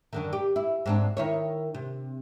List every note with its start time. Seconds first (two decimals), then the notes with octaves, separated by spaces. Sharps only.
0.13 F#2 D3 D#3
0.33 G4
0.56 E4
0.86 G#2 C4 D4
1.17 D#3 E4 C#5
1.74 C3